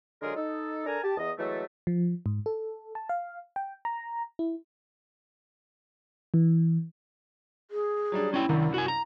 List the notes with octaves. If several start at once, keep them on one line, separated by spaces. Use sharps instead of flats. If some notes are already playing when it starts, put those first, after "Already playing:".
D3 F#3 G#3 F4 G#4 A#4
D#4 A4
D4 A4 A#4 G#5 A#5
G4 A5
E2 D#5
E3 F#3 G#3 A3
F3
G#2
A4
A5
F5
G5
A#5
E4
E3
G#4
F#3 G3 D4
C#4 E4 G5
C2 F#2 D#3 D4
F#4 G#5
A#5